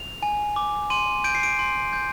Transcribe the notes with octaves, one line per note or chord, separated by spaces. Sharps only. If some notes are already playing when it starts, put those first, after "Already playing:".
Already playing: F7
G#5
D6
C6 D#7
G6 D7
C7
D7
C6
G6